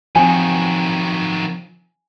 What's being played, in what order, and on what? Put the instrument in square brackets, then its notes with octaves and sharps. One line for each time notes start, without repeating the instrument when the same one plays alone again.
[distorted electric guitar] D#3 F#3 [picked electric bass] F3 C4 [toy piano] G#5